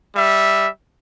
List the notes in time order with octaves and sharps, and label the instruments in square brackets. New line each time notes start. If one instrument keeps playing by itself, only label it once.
[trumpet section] G3 E5